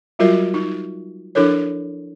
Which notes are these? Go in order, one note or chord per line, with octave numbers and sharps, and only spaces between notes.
F#3 G3 F4 F#4 A#4 D#5
D#4
F3 D4 E4 A4 A#4 C#5